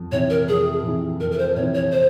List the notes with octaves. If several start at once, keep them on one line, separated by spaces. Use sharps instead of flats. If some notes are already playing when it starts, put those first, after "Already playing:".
Already playing: F2
C3 E3 C#5
A#4
F2 G#4
C3 E3
F2 A#4
A#4
C5
C3 E3 C#5
C#5
C5